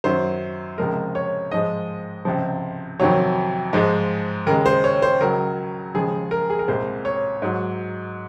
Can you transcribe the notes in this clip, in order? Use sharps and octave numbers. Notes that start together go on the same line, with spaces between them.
F#2 D#3 F#3 C5
C#2 C3 F3 G#3 A#4
C#5
G#2 F3 G#3 D#5
C#2 C3 F3
F2 C3 D#3 F#3 C#5
G#2 F3 G#3
D#2 C#3 G#3 A#4
C5
C#5
C5
C#2 C#3 F#3 A#4
D#2 C#3 F3 G#3 G#4
A#4
G#4
A#4
C2 A#2 G#3 C5
C#5
G#2 F#3